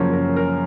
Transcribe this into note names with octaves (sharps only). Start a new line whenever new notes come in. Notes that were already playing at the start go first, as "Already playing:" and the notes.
Already playing: F#2 C#3 F3 A#3 C#4
A#4
A#4